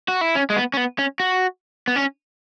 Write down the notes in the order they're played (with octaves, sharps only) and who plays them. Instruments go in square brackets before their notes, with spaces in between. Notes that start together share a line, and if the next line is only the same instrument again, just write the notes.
[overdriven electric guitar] F#4
E4
C#4
G#3
B3
C#4
B3
C#4
F#4
B3
C#4